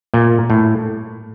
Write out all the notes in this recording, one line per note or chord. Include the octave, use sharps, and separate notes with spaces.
A#2
A2